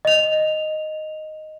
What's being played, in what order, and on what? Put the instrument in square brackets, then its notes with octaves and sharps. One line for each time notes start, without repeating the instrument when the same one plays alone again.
[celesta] D#5 F7